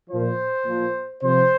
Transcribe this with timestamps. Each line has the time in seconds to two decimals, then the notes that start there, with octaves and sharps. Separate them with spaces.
0.10 A#2 F3 C5
0.66 A#2 F3
1.22 C3 F3 C5